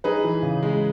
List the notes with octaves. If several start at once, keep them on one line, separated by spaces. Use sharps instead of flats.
D#4 G#4 B4
E3
C#3
G#3